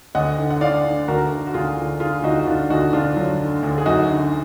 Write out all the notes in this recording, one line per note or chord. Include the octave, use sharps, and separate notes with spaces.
D2 D#5 F#5
D3
F#5
D3 D5 F5
D3
D2 F#4 A#4
D3
F#4
D2 F4 G#4
D2
D3 F4 G#4
D2 D#4 F#4
F#4
D2 D4 F4
D2 D#4 F#4
D2 D4 F4
F#3
D3
D2
G#4
F#2 D#4 F#4
D3